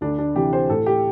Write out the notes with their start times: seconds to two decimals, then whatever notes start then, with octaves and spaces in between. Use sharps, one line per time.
0.01 D2 D4
0.18 D4
0.35 C3 E3 G4
0.53 C5
0.69 A2 A4
0.86 G4